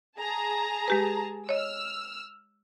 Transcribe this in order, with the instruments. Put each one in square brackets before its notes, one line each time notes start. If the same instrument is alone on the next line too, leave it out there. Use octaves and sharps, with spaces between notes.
[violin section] G#4 A5 A#5
[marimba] G#3 G4 B4
[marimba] C#5 D#5 [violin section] E6 F6